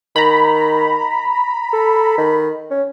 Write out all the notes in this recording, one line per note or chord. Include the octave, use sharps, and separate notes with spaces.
D#3 A#5 B5
A4
D#3
C#4